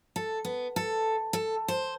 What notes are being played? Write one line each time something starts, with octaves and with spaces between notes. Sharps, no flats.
A4
B3
A4
A4
C5